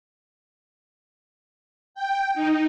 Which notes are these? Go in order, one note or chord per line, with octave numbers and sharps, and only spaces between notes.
G5
D#4